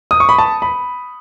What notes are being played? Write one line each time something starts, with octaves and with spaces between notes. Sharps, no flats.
D#6
C#6
B5
A5
B5